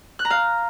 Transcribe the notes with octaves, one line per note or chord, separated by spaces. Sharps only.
F#6
A#5
F5